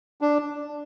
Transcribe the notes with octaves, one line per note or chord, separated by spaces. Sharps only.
D4